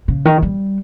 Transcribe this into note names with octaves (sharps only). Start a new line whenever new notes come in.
C#3
D#3
G3